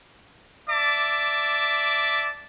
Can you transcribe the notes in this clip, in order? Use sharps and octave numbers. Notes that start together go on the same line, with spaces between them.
D5 E5 A5 D6